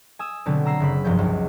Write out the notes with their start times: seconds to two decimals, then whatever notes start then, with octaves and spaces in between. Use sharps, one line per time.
0.19 G#5 D#6 E6
0.46 B2 D3 F#3 B3 C4
0.66 A#5 E6 C7
0.80 F#1 C#3 B5
1.05 F1 G2 F3 C4 C#4 G6
1.19 F#1 C#2 F3